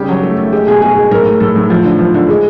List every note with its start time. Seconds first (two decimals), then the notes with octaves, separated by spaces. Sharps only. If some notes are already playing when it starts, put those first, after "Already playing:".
Already playing: C#3 G3 G4
0.09 F#3
0.23 A3
0.38 A3
0.52 G#3 G4
0.67 B2 G#4
0.82 B2 G#4
0.97 G#3
1.11 A2 A#4
1.26 A3
1.40 A2 A4
1.56 A2
1.70 F3
1.85 D3
1.99 F3
2.14 D3
2.29 G#3